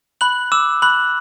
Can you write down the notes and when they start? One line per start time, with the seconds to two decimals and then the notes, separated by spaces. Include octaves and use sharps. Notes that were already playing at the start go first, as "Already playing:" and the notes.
0.21 B5 F#6 F#7
0.52 D6 E6 E7
0.82 B5 F#6 F#7